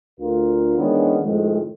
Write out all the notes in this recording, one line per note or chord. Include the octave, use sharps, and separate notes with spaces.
D2 F4 A#4
D#3 E3 G#3 B3 C#4 D4
F2 A2 C3 D#3 G#3